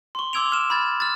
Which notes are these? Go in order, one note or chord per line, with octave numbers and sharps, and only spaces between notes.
C6 C#6
C6 D6 E6 G#6 D7 F7
F6 E7
B5 F6 G#6 A6
F6 A6